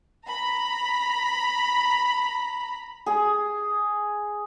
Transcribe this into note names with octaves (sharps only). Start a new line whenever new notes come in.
A#5 B5
G#4